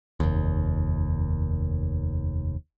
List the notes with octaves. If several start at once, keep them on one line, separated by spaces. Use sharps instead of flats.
F1 D#2